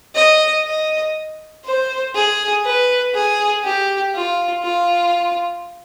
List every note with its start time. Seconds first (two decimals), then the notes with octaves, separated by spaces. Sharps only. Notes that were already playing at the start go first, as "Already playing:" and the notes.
0.15 D#5
0.64 D#5
1.65 C5
2.15 G#4
2.64 B4
3.14 G#4
3.64 G4
4.14 F4
4.63 F4